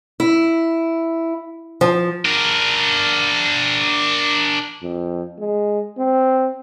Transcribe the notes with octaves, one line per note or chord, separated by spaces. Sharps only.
E4
F3
D4 A#4
F2
G#3
C4